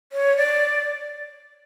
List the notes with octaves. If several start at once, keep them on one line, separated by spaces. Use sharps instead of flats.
C#5
D5